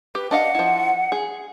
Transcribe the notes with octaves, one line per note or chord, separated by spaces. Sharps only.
G4 B4
D4 D#5 F5 F#5
F3 E4
G#4